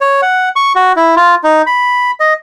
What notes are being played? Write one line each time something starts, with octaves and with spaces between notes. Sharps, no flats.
C#5
F#5
C#6
F#4
E4
F4
D#4
B5
D#5